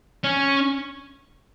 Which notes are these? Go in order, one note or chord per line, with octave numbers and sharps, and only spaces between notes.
C#4